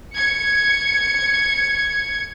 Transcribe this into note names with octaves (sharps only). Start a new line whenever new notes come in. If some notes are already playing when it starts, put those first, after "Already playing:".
G#6 C#7